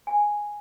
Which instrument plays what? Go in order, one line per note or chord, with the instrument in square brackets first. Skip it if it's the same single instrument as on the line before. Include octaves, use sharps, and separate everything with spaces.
[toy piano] G#5